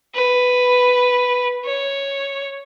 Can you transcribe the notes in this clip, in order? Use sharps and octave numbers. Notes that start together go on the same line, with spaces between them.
B4
C#5